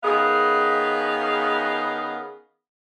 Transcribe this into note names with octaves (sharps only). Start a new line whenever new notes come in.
D#3 B3 C#4 G#4 D#5 F5